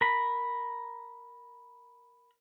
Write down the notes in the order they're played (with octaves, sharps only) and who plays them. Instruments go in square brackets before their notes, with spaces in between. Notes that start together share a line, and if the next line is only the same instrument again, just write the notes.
[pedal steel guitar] A#4 B5